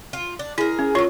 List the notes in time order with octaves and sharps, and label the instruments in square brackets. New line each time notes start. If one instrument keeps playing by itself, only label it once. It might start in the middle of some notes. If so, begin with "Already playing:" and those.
[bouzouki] F4
D4
[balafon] E4 [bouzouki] G#4 A#4
[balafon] C#4
[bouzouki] A3 A#3 [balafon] F4 C#5 C#6